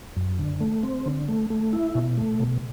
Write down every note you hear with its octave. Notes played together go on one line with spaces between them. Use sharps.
F#2
D3
A3
C4
D3
A3
A3
E4
B2
A3
B2